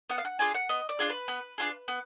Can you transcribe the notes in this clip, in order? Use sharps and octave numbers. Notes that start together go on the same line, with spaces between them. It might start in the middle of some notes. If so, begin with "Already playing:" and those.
B3 F#5
F5
F#5
D4 F4 G#4 G#5
F#5
B3 D#5
D5
D4 F4 G#4
B4
B3
D4 F4 G#4
B3